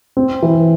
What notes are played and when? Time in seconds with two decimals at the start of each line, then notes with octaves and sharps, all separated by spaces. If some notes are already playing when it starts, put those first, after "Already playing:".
0.17 C4
0.42 E3